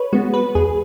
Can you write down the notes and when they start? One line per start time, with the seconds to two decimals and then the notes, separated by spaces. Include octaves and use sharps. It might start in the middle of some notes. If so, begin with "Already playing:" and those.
Already playing: B4 C#5
0.13 G#3 B3 F#4
0.34 B4
0.55 E2 G#4